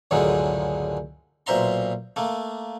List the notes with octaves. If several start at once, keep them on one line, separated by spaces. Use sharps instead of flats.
C#2 F#2 A2 D3 D#3 G#3
B1 A#2 C5 E5 A#5 C6
A3 A#3